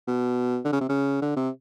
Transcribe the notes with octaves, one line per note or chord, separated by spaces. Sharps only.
B2
D3
C#3
C3
C#3
D3
C3